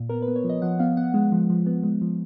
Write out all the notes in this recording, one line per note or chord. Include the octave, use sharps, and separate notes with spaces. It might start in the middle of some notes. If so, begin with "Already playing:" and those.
Already playing: A#2
B3 A#4
B4
B3
C#5
F3
D#5
F3 F#5
B3 F5
B3 F#5
G#3
F3
F3
B3
G#3
F3